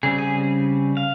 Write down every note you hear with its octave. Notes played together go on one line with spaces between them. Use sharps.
C#3 G3 C4 G#4
G#4
F5